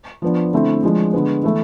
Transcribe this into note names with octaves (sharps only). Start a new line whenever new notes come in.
F3 B3 D4
D3 A3 C4 E4
F3 G#3 D4
D3 G#3 B3
E3 A3 E4